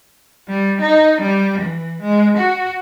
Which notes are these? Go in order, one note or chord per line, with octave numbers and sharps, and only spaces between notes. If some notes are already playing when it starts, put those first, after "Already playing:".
G3
D#4
G3
E3
G#3
F#4